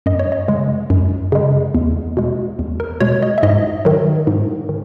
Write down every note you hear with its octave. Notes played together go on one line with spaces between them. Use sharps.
F#2 D#5
C#5
D#5
C#3 G#3
F#2
C#3 G#3
E2
B2 G#3
E2
A#4
B2 G#3 C#5
D#5
E5
G#2 D#5
D#3 F#3
G#2
D#3